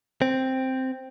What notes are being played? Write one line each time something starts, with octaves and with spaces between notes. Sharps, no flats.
C4